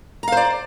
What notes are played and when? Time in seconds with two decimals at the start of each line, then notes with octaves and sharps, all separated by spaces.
0.23 A#5
0.28 F5
0.32 C5
0.37 D5